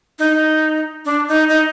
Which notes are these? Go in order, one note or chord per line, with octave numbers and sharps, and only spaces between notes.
D#4
D4
D#4
D#4